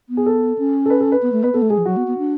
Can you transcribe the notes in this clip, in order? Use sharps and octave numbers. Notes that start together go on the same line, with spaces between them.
B3
G#4
A4
C#4
A4
B4
A4
B4
B3
A3
B3 B4
B3 A4
A3
G#3 G#4
F3
F#3 F#4
B3
B3
D4